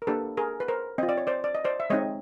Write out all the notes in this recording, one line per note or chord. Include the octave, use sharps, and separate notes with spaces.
A#4
A#3 D4 G4 A4 B4
G#4 A#4
B4
A#4 C5
C4 F4 D#5
D5
C#5
C5 D5
D5
D#5
C5 D5
E5
G#3 C4 D#4 C#5 D#5